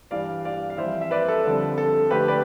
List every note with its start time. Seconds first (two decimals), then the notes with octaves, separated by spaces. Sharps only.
0.11 G2 E3 G3 D5 F5
0.45 D5 F5
0.70 F5
0.77 F2 E3 G3 C5 E5
1.01 E5
1.11 B4 D5
1.28 A4
1.44 F2 D3 G3
1.78 A4
2.10 F2 D3 A3 G4 B4
2.28 B4 D5